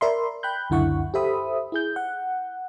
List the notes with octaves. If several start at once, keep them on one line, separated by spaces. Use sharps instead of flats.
A#4 D5 E5 B5 C6
G5 B5 F#6 G6
C#2 F#2 D3 E4 F#5 C#6
G4 A4 C5 E5 B5 D#6
E4 G#4 G6
F#5